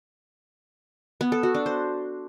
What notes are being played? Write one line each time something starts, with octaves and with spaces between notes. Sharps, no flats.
B3
A4
F#4
D4
C5